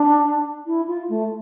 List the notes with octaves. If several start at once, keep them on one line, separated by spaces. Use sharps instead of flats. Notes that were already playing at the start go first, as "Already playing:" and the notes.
Already playing: D4
E4
F4
A3